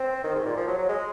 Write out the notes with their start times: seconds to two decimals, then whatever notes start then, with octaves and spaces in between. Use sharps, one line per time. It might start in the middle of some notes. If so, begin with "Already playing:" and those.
Already playing: C4
0.24 D#3
0.35 G#2
0.46 A#2
0.57 F3
0.67 F#3
0.78 F#3
0.88 G#3